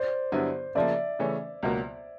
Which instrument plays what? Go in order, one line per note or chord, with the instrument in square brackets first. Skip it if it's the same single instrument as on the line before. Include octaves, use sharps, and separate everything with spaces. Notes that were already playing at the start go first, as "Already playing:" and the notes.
Already playing: [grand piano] C5 D5
[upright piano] G2 D3 F#3 B3 E4
[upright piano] C#3 F3 A#3 [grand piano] D5 E5
[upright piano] C#3 E3 A3 C#4
C#2 B2 F#3 A#3